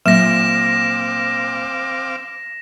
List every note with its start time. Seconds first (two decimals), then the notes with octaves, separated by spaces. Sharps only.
0.06 A#2 F#3 C4 F5 D6 A#6 E7